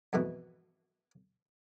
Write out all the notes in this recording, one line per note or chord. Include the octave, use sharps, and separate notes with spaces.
F2 G#2 B2 E3